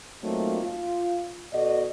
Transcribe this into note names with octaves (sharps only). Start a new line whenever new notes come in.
F#3 A3 A#3 C4 D#4 F4
F4
B2 F#4 A4 D5 D#5